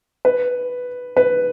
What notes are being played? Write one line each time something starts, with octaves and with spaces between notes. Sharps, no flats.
B4
B4